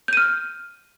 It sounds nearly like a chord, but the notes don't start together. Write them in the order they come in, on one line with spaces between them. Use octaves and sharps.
G6 D#7 F6